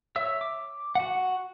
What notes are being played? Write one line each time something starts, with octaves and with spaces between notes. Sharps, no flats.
C#5 E5 E6
D6
F#4 F#5